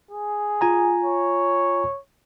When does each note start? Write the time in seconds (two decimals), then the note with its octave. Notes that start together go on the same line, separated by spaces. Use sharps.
0.11 G#4
0.61 F4 G#5 A#5
1.04 C#5